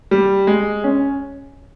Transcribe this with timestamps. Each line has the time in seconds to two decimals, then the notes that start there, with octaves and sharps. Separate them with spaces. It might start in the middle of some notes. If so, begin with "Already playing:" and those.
0.11 G3
0.47 G#3
0.84 C#4